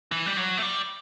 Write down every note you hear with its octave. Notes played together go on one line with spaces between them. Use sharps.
E3
G3
F#3
A3
G3